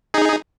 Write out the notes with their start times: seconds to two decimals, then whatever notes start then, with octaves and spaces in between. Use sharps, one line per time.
0.14 D#4 G#4